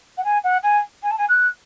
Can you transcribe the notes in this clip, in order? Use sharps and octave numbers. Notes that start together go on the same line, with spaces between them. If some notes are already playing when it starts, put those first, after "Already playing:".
F#5
G#5
F#5
G#5
G#5
A5
G#5
F#6